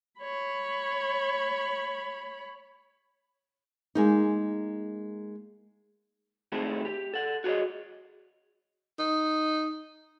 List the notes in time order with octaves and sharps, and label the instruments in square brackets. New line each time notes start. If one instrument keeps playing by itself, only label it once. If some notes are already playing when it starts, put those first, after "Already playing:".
[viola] C#5 B5
[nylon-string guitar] G#3 A#3 D#4
[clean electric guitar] D#3 A3 C4 E4 G#4 A4
G4
A4 F#5
F#4 G#4 A#4 C#5 D#5
[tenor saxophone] D#4